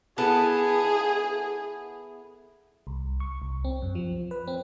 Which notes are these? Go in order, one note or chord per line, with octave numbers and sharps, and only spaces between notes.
B3 E4 G#4 A4
C2
C#6
C2
C4
F#2
F3
B4
C4